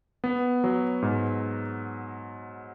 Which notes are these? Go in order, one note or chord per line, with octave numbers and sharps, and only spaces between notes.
B3
F#3
G#2